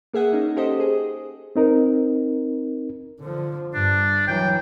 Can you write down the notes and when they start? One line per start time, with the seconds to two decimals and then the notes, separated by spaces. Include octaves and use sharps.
0.13 A#3 G#4 E5 F#5
0.33 C#4 D#4
0.57 G4 A4 C5 D#5
0.80 G#4
1.56 C4 D#4 A#4
3.20 D3 F3
3.74 G2 D4
4.27 E3 F#3 G5